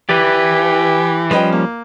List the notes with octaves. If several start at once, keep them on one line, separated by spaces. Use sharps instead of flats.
E3 G4 B4 D5
F3 G3 C#4 B4 D#5 G5
A#3